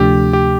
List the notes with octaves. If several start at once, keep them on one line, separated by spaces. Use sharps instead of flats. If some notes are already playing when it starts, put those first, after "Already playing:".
Already playing: D2 C3 F3 A3 D4 G4
G4